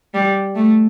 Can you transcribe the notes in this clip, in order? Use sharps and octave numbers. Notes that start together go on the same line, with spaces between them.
G3
A3